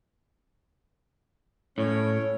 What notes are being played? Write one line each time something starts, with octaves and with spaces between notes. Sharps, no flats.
A2 C#4 C#5